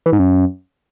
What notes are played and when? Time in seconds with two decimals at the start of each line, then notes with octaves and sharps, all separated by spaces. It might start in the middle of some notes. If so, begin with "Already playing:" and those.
0.06 E3
0.12 G#2
0.19 F#2